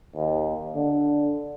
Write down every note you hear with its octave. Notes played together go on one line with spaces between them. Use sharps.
D#2
D3